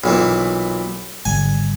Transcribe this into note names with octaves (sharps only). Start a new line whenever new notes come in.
B1 A#2 E3
G#1 D3 G3 G#5